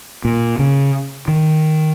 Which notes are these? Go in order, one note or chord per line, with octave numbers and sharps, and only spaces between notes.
A#2
C#3
D#3